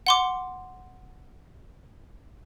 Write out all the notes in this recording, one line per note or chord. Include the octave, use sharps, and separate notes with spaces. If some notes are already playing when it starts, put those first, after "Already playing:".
F#5 C6 D6